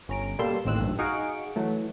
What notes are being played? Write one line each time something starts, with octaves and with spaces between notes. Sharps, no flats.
G1 C#4 A#5 D7
B2 G3 A#3 A4 C6 E7
A1 D#2 C4 E6 F#6
A#1 G2
D#4 F#4 G#4 F5 C#7 D7
E3 F#3 A3